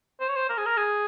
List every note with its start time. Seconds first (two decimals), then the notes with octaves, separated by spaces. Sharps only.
0.21 C5
0.29 C#5
0.36 C5
0.49 A#4
0.58 G#4
0.66 A#4
0.77 G#4